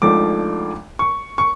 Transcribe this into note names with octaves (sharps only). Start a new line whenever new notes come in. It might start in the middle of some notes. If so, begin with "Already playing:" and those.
G#1 G#2 F3 A3 D4 D6
C#6
C#6